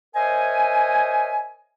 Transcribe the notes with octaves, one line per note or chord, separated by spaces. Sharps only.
A#4 C5 C#5 D#5 E5 G#5